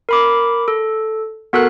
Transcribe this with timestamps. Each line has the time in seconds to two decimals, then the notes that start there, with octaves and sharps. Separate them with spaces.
0.09 A#4 B5 D6
0.68 A4
1.53 B3 F#4 A4 A#4 F#6